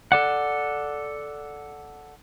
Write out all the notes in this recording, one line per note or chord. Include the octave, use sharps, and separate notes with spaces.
A4 D5 F#5